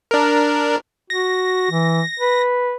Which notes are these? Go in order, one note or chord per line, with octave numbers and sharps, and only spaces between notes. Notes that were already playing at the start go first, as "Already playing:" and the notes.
D4 A#4
F#4 A#6
E3
B4